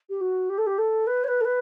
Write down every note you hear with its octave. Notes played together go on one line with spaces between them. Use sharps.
G4
F#4
G4
A4
G4
A4
B4
C#5
B4
A4
B4